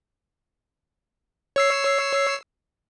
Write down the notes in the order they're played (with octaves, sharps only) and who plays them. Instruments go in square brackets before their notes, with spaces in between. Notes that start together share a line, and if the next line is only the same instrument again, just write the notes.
[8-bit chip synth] C#5 E6 C7